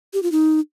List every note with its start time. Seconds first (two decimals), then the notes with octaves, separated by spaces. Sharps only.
0.14 G4
0.23 F4
0.32 D#4